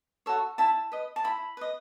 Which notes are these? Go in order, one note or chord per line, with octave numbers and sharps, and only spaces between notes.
F#4 A4 C#5
E4 A5
B4 D#5
A5
E4 B5
B4 D#5